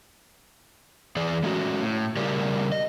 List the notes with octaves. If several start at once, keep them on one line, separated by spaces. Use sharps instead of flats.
E2 E3 G#4 D5
G#3 A3 C#4 E4 F#4
A2
C#3 G3 G4 A#4 D5
D#5